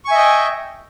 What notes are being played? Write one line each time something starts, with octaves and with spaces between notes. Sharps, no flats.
D#5 E5 G5 G#5 C#6